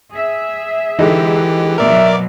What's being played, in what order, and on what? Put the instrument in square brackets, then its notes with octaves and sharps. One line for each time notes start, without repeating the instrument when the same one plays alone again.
[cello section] G#4 E5
[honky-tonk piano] D3 G#3 D#4 [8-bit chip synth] E3 G4
[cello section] B2 F#3 [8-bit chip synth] A#4 D5 D6 [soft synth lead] E5